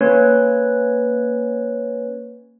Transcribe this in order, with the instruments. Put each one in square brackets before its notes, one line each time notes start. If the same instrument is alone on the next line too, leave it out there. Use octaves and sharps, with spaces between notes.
[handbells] A#3 C#4 B4 C#5